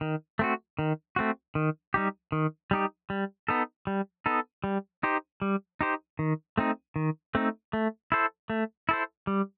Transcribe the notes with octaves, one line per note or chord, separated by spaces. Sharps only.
D#3
A3 C4 F#4
D#3
A3 C4 F#4
D#3
G3 D#4 G4
D#3
G3 D#4 G4
G3
B3 D#4 A4
G3
B3 D#4 A4
G3
D#4 G4 C5
G3
D#4 G4 C5
D#3
A3 C4 D#4
D#3
A3 C4 D#4
A3
E4 A4 C5
A3
E4 A4 C5
G3